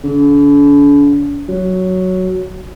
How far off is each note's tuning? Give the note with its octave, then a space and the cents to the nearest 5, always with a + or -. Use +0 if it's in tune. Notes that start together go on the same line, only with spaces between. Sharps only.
D3 -45
F#3 +5